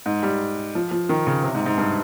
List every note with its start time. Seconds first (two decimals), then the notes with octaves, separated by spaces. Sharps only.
0.06 G#2
0.23 G3
0.75 F3
0.91 F3
1.09 D#3
1.27 C#3
1.44 C3
1.55 G#2
1.66 G#2
1.78 G2